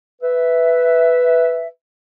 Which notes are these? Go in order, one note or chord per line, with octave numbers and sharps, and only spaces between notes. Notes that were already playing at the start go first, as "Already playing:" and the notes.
B4 E5